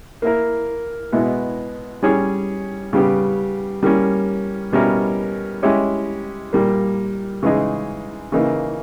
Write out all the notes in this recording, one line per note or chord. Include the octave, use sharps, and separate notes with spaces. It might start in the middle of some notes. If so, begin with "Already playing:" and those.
A#3 E4 A#4
B2 G#3 B3 E4
G3 C#4 G#4 C#5
C#3 G3 B3 G4
G3 A#3 C#4
B2 G3 C#4 E4 A#4
G#3 C#4 E4 G4 C#5
A#2 G3 A#3
C#3 E3 G#3 D#4 G#4
C#3 E3 A#3 D#4